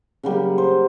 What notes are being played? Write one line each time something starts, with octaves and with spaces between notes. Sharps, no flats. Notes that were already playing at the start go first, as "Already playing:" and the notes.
C#3 F#3 G3 A#3
C5